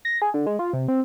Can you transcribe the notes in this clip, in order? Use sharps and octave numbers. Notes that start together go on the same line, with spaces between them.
A#6
G#4
D3
G#3
F4
C3
C4